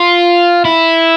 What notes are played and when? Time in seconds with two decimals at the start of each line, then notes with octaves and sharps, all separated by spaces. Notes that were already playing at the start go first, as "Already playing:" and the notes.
Already playing: F4
0.65 E4